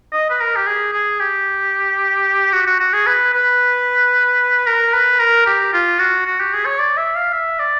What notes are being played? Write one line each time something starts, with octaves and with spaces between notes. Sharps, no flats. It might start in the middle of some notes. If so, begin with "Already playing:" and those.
D#5
B4
A#4
G4
G#4
G#4
G4
F#4
F#4
F#4
G#4
B4
B4
A#4
B4
A#4
G4
F4
F#4
F#4
G4
G#4
C#5
D5
E5
F5
E5
D5